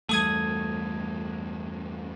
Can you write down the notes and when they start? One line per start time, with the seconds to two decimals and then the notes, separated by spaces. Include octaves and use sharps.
0.09 E2 G2 A3 A4 D#6 G#6